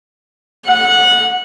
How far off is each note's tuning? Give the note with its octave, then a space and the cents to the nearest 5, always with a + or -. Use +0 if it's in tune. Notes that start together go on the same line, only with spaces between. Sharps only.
F#5 -20